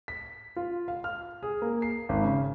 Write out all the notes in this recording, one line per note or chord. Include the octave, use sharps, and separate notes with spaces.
B6
F4
F5
F6
G#4
A#3
C7
G#1
C#3